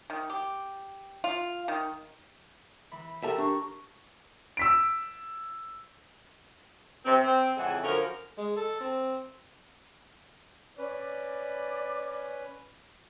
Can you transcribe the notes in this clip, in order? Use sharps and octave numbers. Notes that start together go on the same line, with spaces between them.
D#3
G4
F4
D#3
E3 B5
G4 A4 A#4 C5 E5 A5
D4 C#6
E6 B6 D7
C3 C4
C4
F2 C#3 E3 G#3 G#4 F#5
F#2 D3 F3 C#4 A#4
G#3
A4
C4
C#4 B4 D5